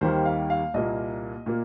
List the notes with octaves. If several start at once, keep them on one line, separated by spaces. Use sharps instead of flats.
D#2 D#3 G3 A#3 C5
F5
F5
C2 A#2 A#3 D#5
A#2 A#3